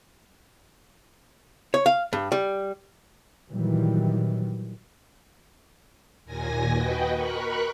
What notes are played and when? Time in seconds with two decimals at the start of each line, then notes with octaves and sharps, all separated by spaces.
1.74 C#5
1.86 F5
2.13 G2
2.32 G3
3.52 A#2 D#3 E3 F#3 G3
6.25 D#2 A#2 G#5 A#6
6.73 F#4 B4 D#5 G5
7.13 A#4 B5 C#6 F#6